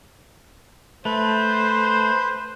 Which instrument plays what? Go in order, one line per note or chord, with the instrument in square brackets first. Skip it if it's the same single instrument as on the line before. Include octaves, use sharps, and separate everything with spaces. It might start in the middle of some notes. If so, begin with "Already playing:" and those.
[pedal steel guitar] A3 [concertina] B4 [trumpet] C5